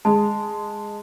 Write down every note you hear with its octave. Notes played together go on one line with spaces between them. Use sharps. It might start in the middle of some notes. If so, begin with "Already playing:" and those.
G#3 A5